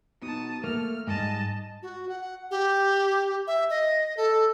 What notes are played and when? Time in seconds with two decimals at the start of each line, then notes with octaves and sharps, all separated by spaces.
0.22 B3 D#4 F#4 A5 D#6
0.64 A3 A#3 F6
1.07 G#2 G3 G#3 D#5 A5
1.82 F#4
2.09 F#5
2.51 G4
3.47 E5
3.70 D#5
4.17 A4